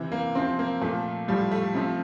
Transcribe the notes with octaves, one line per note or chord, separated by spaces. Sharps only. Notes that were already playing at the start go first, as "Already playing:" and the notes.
Already playing: C3 E3
A#3
C3 F3 C4
A#3
A#2 F3 A3
A2 F3 G3
A3
C3 F3